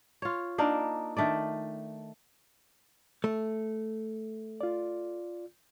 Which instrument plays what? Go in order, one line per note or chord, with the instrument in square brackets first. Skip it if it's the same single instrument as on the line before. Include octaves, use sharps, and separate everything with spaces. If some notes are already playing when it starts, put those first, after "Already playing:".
[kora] F4 C#5
A#3 D4 D#4 A#4
D#3 A3 D4 D5
[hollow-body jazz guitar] A3
[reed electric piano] F4 D5